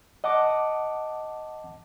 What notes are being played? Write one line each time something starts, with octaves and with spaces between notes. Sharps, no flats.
D#5 F#5 A5 D6